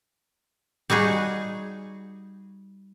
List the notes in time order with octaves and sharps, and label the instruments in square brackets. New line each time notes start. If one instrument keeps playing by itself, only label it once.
[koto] G3 D#4 F#4 G#4